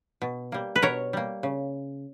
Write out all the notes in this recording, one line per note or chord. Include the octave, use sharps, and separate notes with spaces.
B2
G3 A#3
B4
B2 A#4 C#5
G3 A#3
C#3